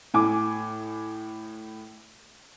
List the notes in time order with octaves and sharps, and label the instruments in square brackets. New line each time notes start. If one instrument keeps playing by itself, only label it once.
[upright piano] A2 G#5 D6